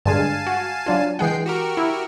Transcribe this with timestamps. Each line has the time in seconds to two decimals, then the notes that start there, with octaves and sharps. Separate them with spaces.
0.06 G2 D3 G#3 F5 G#5 A5
0.47 F#4
0.86 F#3 D4 F4
1.19 E3 G#3 G#4 F#5 G5 C7
1.46 F#4 G4 A#4
1.77 E4